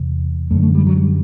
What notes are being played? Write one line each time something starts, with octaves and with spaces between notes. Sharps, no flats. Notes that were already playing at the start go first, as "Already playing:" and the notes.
Already playing: E2 C3
F#2 D3 A3
A3
G3
F#3
G3